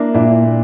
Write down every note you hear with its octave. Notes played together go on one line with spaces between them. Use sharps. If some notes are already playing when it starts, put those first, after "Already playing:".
Already playing: A#3 D4 E4
A#2 D4 E4